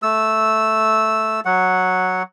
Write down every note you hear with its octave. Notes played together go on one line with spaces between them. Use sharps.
A3 E6
F#3 F#5